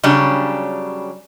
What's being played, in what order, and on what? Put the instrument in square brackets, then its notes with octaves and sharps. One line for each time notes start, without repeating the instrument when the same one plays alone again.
[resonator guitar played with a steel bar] C#3 F#3 G3 C#4 D4